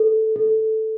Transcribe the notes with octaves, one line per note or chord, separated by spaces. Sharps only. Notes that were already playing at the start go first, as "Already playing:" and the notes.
Already playing: A4
A4